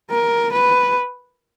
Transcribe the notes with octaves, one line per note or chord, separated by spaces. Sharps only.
A#4
B4